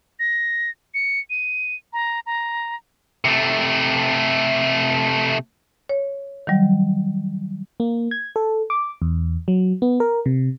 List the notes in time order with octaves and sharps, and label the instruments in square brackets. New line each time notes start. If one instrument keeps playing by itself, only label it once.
[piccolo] A#6
C#7
D#7
A#5
A#5
[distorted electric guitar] C3 A3
[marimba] C#5
D#3 F#3 G3
[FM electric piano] A#3
G#6
A4
D6
E2
F#3
B3
A#4
C3